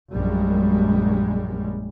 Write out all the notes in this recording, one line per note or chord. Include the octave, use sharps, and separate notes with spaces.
A#1 F#2 G3 G#3